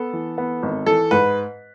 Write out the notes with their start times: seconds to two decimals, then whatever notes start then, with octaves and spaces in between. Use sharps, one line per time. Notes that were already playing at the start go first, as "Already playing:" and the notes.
Already playing: B3 A4
0.13 E3
0.38 B3
0.63 G#1
0.86 E3 A4
1.11 G#2 B4